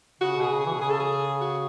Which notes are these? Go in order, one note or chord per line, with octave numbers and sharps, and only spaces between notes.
C#3 F#4
B2
G#4
C#3
G#4
E3
B2
C#3 G#4
A4
G#4
F#4